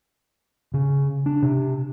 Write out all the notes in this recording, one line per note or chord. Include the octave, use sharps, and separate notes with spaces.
C#3
D4
C3